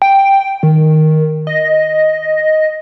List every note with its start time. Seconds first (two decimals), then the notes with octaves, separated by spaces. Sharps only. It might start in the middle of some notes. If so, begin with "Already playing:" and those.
0.02 G5
0.63 D#3
1.47 D#5